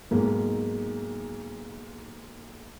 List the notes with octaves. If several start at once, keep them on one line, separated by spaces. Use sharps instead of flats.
B1 G#2 A#3